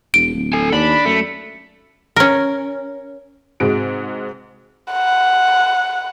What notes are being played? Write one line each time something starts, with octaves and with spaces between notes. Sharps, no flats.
E1 D7
D1
A4 G#5
D#2 D4 B5
F#2 A3
C#4 A#4
G#2 C3 G#3 F#4 D7
F#5